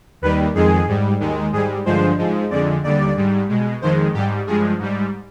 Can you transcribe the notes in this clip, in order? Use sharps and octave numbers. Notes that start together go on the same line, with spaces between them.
D#2 D#3 G3 B4
F2 D#3 G#3 G#4
G#2 G3
D#2 D#3 G#3
G#2 G3 G#4
G2 D3 F3 G#3 C5
G#2 F3 G#3
F2 D3 G#3 D5
D#2 D3 G3 D5
G#2 G3
B2 G#3
F2 D#3 G#3 C5
G#2 G3 G4
G2 F3 G#3 G#4
G#2 G3